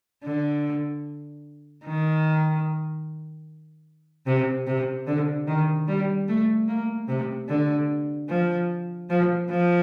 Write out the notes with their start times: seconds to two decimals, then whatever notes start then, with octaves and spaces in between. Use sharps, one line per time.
0.24 D3
1.85 D#3
4.27 C3
4.67 C3
5.07 D3
5.47 D#3
5.88 G3
6.28 A3
6.68 A#3
7.08 C3
7.49 D3
8.29 F3
9.10 F3
9.50 F3